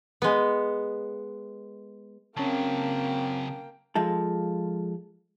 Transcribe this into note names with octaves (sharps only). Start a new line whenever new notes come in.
G#3 B3
C#3 F#3 A#3 C4 C#4 G5 A5
F3 G#3 A4